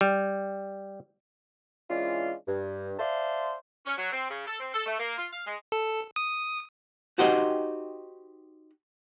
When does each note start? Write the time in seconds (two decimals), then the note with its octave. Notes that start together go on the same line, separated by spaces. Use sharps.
0.01 G3
1.90 E3 G#3 C#4 D4 F4
2.47 G2
2.99 C5 D5 E5 F5 A5 C6
3.86 C#4
3.98 F#3
4.12 C4
4.30 C#3
4.47 A4
4.60 C4
4.74 A4
4.86 A3
5.00 A#3
5.18 F4
5.33 F5
5.46 G#3
5.72 A4
6.16 D#6
7.18 D#4 F#4 G4 C5 D#5